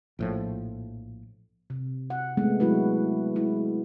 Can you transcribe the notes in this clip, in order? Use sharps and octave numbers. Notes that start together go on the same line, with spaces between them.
A#1 A2 F3
C3
F#5
G#3 A3 B3 C4
F#3 G#3 E4 F#4 B4
G#3 E4